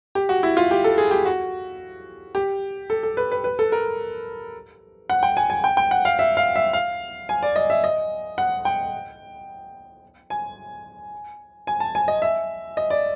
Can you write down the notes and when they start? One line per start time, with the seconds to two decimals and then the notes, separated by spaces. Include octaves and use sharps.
0.15 G4
0.29 F#4
0.43 E4
0.57 F4
0.71 G4
0.84 A4
0.98 G#4
1.11 G4
1.25 F#4
2.35 G4
2.90 A4
3.03 A4
3.17 B4
3.32 B4
3.44 B4
3.59 A4
3.72 A#4
5.10 F#5
5.23 G5
5.37 G#5
5.50 G#5
5.64 G5
5.77 G5
5.91 F#5
6.05 F5
6.19 E5
6.37 F5
6.56 E5
6.73 F5
7.29 G#5
7.43 D5
7.56 D#5
7.70 E5
7.84 D#5
8.38 F#5
8.65 G5
10.30 G#5
11.67 G#5
11.80 A5
11.95 G#5
12.08 D#5
12.22 E5
12.77 D#5
12.90 D5